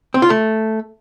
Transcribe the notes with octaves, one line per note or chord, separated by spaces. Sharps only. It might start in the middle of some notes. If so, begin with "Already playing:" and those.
C4
F4
A3